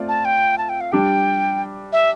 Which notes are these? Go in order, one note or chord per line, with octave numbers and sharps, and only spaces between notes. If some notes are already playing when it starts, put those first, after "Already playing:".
Already playing: A3 C4 F4 D5
A5
G5
A5
G5
F5
G3 D4 G4 G5
E5